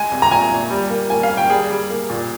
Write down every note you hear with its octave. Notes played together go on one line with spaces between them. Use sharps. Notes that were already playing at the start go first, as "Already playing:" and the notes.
Already playing: G#3 G#5
C2
A#5
A#2 G#5
A#2
G3
A#3
A#3 G#5
F5
A#3
G5
G3 G#4
G3
A#3
A#2